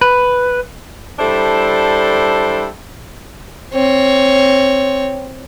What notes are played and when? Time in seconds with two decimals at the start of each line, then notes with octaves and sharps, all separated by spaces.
0.01 B4
1.19 G3 D4 E4 A4 C5
3.73 C4 C#5